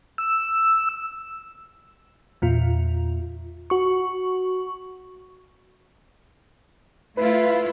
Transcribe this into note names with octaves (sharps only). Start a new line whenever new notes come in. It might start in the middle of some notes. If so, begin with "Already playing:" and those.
E6
E2 A#2 F4
F#4 C#6
A3 E4 F4 B4